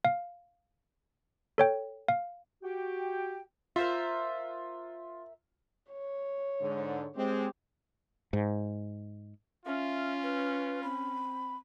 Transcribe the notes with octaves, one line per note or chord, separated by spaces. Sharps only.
F5
A4 C#5 G5
F5
F#4 G4 G5
F4 A#4 C5 E5
C#5
G#2 D3
G#3 C4 G4
G#2
C#4 F4 E5
B4
C4 B5